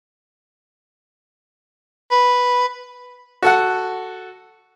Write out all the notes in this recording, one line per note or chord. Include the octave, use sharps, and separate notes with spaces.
B4
F#4 A4 F#5